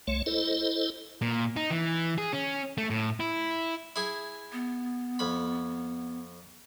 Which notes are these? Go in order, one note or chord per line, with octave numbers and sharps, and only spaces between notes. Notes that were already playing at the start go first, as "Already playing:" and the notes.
C2 A3 C#5
E4 A4 C5 D#5
A#2
D#4
E3
G#4
C#4
A3
A2
E4
E4 G#4
B3
F2 B5